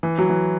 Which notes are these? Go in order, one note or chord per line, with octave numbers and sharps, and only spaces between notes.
E3
F#3
E3